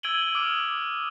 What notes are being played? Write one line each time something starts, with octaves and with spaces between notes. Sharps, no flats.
E6 G#6 D7 D#7 F#7 G7
D6 D#6 F6 D7